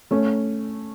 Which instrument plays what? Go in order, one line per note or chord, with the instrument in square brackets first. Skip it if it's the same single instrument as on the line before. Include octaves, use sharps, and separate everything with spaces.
[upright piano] A3 C#4